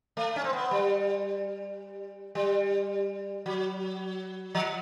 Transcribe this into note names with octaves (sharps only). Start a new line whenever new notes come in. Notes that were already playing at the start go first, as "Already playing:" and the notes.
A3
C#4
C4
B3
G3
G3
F#3
F3